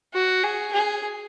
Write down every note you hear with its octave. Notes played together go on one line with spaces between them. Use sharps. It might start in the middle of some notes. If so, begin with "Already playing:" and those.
F#4
G#4
G#4